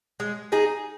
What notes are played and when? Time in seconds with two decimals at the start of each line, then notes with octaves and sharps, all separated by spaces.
0.20 G#3
0.52 D#4 G#4